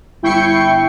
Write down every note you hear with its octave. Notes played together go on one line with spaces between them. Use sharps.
G1 E4 G5 C#6 C7 C#7